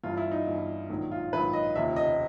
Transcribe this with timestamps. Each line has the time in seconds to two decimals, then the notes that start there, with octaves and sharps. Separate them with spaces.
0.04 G1 G2 E3 F4
0.17 E4
0.32 D#4
0.46 G1 G2 E3
0.90 A#1 G#2 D#3 F#3
1.11 F4
1.32 A#1 G#2 D#3 F#3 B4
1.53 D#5
1.75 F1 D#2 C#3 F3 E5
1.96 D#5